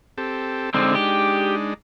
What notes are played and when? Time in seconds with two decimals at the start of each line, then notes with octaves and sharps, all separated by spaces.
0.18 C4 G4 A4
0.74 D3 G#3 C4 D4 D#4
0.95 G4